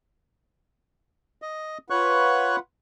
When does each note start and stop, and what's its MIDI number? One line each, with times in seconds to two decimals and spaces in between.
1.42 1.78 75
1.90 2.59 65
1.90 2.59 71
1.90 2.56 73
1.90 2.59 78
1.90 2.56 85
1.90 2.56 90